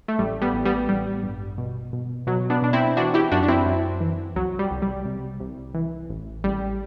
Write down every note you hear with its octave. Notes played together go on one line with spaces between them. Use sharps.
A3
A1 G3
G3 B3
A1
G3 B3
A1 G3
G2
B2
B2
B2 F#3
B3 D4
B2 D4
C4 E4
E3 D4 F#4
E4 G4
F#2 D4 F#4
D4
C4 E4
F#2
E3
C2 F#3
G3
C2
G3
C3
C2
E3
A1
A1 G3